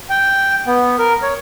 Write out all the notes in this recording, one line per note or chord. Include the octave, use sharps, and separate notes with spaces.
G5
B3
A#4
C#5